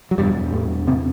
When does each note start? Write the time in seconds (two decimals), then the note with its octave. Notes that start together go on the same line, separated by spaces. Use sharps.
0.11 F#3
0.18 E2 G2 B2 G3
0.53 A2 A3
0.87 C3 C4